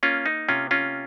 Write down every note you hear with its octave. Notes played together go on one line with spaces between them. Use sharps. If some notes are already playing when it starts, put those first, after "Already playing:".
A#3 C#4 F4
D#4
C3 C#4 F4
C#4 F4